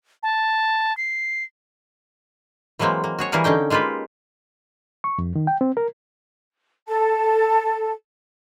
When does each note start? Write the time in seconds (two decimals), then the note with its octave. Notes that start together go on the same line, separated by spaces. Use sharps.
0.23 A5
0.97 C7
2.79 E3 F#3 G#3 A#3 C4
3.04 A#3
3.19 F#4 G#4 C#5
3.32 E3 G3 A#3 G#4 A#4
3.44 D3 C#4 D#4 G5
3.70 G#3 A#3 F4 G4 B4
5.04 C#6
5.18 F2
5.36 D#3
5.47 G5
5.61 C4
5.77 A#4
6.87 A4 A5